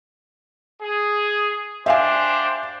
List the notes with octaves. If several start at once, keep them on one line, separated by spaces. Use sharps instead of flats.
G#4
D4 G4 C5 E5 F5 G#5